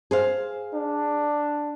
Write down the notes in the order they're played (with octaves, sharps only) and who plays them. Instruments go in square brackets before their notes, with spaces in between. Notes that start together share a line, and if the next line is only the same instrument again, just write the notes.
[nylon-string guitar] G#4 C5 F5
[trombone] D4